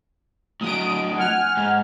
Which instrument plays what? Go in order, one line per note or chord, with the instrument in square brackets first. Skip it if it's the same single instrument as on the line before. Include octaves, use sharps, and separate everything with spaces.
[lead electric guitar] A2 F#3 [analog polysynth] D#6 D7
[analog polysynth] F#5 G#5 F6
[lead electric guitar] G#2